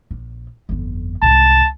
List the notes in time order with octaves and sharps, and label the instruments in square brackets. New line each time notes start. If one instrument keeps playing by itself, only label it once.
[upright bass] A#1
G1 F2
[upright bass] C2 G#2 [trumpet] A5